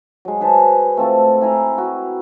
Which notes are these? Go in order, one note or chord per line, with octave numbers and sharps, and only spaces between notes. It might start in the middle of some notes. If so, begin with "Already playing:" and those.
F#3 G#3
G#4 B4 C5 A5
A3 C4 F4 A4
E4 G#5 A#5 C6
F#4